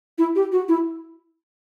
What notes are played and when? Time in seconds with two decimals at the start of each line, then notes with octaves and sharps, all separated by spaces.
0.18 E4
0.36 G4
0.52 F#4
0.68 E4